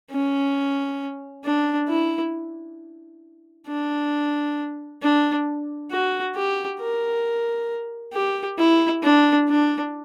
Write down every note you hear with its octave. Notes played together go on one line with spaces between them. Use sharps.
C#4
D4
E4
D4
D4
F#4
G4
A#4
G4
E4
D4
D4